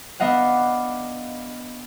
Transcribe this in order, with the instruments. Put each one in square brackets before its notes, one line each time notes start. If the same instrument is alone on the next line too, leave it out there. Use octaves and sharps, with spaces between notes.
[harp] B3 D4 D#5 F5 F#5